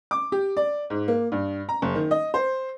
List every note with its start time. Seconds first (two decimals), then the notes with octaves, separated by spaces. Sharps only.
0.11 D6
0.32 G4
0.57 D5
0.90 G#2
1.08 A#3
1.32 G2
1.69 A#5
1.82 F#1
1.95 D#3
2.11 D#5
2.34 C5